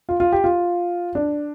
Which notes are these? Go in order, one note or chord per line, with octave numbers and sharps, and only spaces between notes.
F4
F4
G4
F4
D4